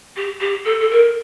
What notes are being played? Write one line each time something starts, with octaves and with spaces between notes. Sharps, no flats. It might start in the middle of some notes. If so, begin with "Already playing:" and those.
G4
G4
A4
A4
A#4